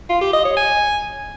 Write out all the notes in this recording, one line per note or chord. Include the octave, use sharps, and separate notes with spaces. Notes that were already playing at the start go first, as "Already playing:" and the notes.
F4
G4
D#5
C#5
G#5